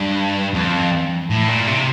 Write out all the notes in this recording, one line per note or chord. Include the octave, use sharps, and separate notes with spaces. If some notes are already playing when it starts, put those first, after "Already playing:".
Already playing: G2
F2
A2
A#2
C3